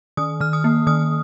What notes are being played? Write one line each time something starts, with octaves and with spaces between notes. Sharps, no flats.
D#3 D#6
D#3 F6
D#6
A#3
D#3 D#6